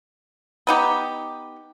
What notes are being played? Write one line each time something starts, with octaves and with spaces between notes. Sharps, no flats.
B3 D#4 G4